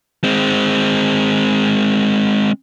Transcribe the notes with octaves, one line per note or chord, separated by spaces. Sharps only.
G#3 C4